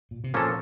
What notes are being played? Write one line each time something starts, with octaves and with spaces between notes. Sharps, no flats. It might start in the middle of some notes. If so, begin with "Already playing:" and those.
A#2
C3
A#2 F3 A#3 C#4 A4